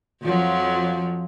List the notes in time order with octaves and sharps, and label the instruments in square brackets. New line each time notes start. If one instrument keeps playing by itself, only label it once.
[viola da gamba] F2 F3 F#3